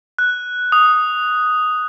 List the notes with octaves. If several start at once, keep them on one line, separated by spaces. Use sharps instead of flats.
F#6
D#6